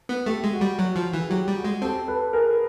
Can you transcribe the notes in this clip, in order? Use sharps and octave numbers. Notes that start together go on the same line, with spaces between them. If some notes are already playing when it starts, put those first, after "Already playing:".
B3
A3 G4
G#3
F#4
G3
F#3
F3
E3
G#4
F#3 G4
G3
F#4 G#4
G#3
C4 G4 A4
A4 B4
G#4 A#4